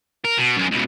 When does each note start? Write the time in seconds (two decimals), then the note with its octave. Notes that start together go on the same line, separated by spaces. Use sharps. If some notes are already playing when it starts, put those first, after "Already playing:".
0.25 A#4
0.38 B2
0.57 F#2 G#3
0.71 C#2 B2